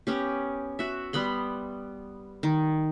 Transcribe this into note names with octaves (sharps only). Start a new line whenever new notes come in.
B3 C#4 G4
F#4 E5
G3 B3 B5 C6
D#3